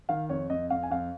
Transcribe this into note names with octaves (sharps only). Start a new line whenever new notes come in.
D#3 F5
F2 C#5
F2 D#5
F2 F5
G#5
F2 F5